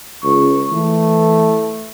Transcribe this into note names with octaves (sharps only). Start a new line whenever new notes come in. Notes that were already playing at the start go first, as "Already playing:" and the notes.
C#2 C#6
E3 A3